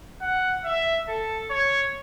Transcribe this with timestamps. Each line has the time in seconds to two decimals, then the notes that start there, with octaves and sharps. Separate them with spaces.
0.22 F#5
0.65 E5
1.08 A4
1.50 C#5